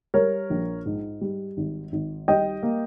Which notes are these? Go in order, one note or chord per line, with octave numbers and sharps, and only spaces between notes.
G3 A#4 C#5
A#1
G#2
G3
G#1
G#1
G3 D#5 G5
A#3